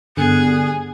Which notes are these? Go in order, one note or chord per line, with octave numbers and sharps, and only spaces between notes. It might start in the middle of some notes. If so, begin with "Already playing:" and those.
G2 D3 B3 G#4 F#6